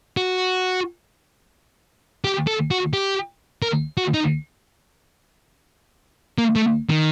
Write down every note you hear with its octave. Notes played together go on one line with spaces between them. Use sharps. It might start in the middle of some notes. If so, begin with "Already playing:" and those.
F#4
G4
A4
F#4
G4
A#4
F#4
D#4
A#3
A3
D#3